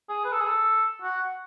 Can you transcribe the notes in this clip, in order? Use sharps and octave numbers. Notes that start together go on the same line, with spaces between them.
G#4
B4
A4
G#4
A4
F#4